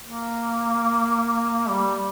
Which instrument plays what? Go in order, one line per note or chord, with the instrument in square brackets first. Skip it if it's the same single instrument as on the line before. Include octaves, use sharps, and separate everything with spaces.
[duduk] A#3
G3